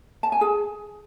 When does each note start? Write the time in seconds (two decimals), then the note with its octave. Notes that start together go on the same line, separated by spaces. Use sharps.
0.23 A5
0.32 G#5
0.41 G#4